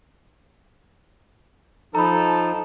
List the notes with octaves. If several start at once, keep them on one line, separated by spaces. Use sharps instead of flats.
F3 D#4 A4 A#5 B5